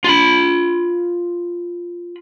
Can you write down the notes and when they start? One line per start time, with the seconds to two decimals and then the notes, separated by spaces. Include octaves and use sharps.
0.04 F4 B5